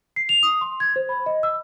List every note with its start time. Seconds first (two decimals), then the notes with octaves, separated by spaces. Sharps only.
0.16 C7
0.29 F7
0.43 D#6
0.61 C6
0.80 G#6
0.96 C5
1.09 B5
1.26 D#5
1.43 E6